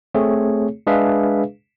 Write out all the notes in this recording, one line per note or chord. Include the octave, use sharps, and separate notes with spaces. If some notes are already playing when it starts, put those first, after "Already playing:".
A3 C4 G#4 C#5
G#3 D4 G#4 B4 E5 F5